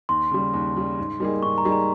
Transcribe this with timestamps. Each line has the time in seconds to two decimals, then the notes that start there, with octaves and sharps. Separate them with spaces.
0.09 D#2 C6
0.31 C#3 G3
0.53 D#2
0.76 C#3 G3
0.98 G#2
1.20 G3 A#3 D#4 G#4
1.42 G#2 C#6
1.58 A#5
1.65 G3 A#3 D#4 G#4
1.72 A#5